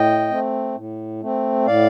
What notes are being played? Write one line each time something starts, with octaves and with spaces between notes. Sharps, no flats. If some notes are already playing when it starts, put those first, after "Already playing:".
Already playing: A2 D#5 G5
A3 C4
A2
A3 C4
A2 D5 F5